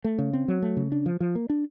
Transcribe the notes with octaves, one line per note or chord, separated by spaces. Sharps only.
A3
C#3
C4
F#3
A3
C#3
D4
F3
F3
A#3
D4